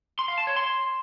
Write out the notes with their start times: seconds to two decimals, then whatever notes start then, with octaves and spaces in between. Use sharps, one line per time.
0.19 C6
0.28 F5
0.38 A5
0.47 C#5
0.56 C6